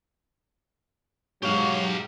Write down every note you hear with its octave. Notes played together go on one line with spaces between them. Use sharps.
G#2 B2 F#3 G4 F5 C#6